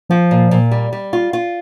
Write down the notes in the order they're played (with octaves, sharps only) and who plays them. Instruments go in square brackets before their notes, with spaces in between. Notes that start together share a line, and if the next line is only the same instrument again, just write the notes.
[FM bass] F3 [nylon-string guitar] F4
[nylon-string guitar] A#2
A#2
G3
G3
F4
F4